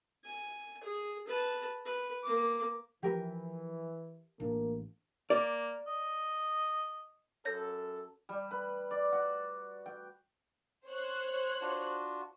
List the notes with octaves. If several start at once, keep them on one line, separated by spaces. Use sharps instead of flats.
G#5
G#4
B4 A5
B4
A#3 D6
E3 F3 G4 A#4 B4
A1 A2 A#3 D4
A#3 D5
D#5
F#2 A4 C#5 G6 A#6
G3
B4
D5
F#4
G5
C5 C#5 F#6
D4 F4 F#4